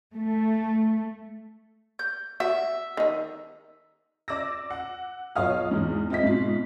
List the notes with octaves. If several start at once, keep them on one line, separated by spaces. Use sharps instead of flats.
A3
G6
F#4 E5
D#3 D#4
D5 D6 E6 A#6
F#5
B1 F4 C#5 F5 D#6 F6
E2 G#2
C4 F4 D#5 E5 B6
G#2 B2 F4